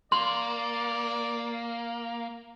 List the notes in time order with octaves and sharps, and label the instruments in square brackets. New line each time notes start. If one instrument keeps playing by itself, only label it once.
[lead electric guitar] A#3 [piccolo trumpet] D5 [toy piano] C6